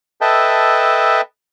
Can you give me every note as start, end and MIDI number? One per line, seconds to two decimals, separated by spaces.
0.21 1.21 69
0.21 1.21 71
0.21 1.21 75
0.21 1.21 76
0.21 1.21 79
0.21 1.21 81